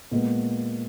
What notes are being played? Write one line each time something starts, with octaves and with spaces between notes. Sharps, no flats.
A#2 G#3 B3